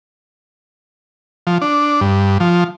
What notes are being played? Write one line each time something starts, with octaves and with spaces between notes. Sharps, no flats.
F3
D4
G2
F3